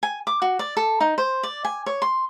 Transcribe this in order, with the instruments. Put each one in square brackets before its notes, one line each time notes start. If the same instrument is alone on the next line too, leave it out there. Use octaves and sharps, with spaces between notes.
[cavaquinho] G#5
D6
F#4
D5
A4
D#4
C5
D5
G#5
C#5
C6